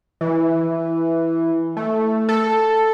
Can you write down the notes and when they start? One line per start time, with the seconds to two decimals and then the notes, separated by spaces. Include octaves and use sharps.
0.21 E3
1.77 A3
2.29 A4